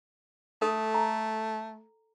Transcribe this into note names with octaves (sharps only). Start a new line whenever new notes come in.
A3 A4
A#5